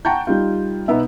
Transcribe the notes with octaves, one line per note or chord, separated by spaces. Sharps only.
F#5 G5 A5 A#5 C#6 G6
G3 D#4 F4
B2 B3 D#4 E5